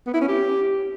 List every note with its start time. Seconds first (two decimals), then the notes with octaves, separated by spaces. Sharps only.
0.07 B3
0.14 E4
0.21 C#4
0.28 G4